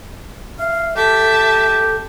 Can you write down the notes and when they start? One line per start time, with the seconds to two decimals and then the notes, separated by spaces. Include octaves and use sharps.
0.59 E5 F5
0.97 G4 A4 E5 A5